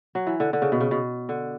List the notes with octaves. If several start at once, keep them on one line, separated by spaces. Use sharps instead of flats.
F#3
E3
D3
D3
C#3
B2
C#3
B2
D3